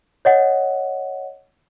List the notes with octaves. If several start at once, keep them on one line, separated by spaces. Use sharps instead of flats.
C#5 D#5 F#5